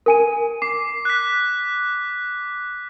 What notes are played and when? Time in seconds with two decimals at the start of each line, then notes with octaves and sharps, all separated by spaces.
0.06 A#4 G#5 D#7
0.62 D6 C7
1.05 F#6 B6